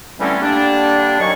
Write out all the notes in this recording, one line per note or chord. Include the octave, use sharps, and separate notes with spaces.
D3 E3 G3 A3 C4 C#4
D3 G3 A#3 D4
D#2 D#3 F#3 G#5 C#6